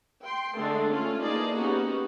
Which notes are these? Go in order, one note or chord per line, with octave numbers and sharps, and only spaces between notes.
G5 C6
D3 G#3 A3 D4
A3 C#4 F4
E3 A#3 D#4 G#4 D5 A5
A#3 B3 C#4 D#4 F#4 G4